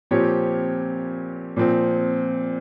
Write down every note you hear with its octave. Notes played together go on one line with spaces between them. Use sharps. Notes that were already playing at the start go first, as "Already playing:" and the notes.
A#2 F3 C4 G4 C#5
A#2 F3 C4